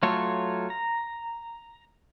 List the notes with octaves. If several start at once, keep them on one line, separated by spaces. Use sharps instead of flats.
F#3 A3 F4 A4 C#5
A#5